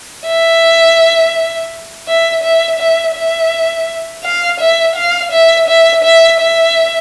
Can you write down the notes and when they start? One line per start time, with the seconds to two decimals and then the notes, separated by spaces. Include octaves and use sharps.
0.27 E5
2.08 E5
2.43 E5
2.79 E5
3.15 E5
4.24 F5
4.60 E5
4.96 F5
5.32 E5
5.68 E5
6.04 E5
6.40 E5